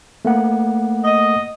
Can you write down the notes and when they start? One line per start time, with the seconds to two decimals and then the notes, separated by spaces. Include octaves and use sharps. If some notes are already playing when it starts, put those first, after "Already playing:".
0.25 A3 A#3 F#5
1.04 D#5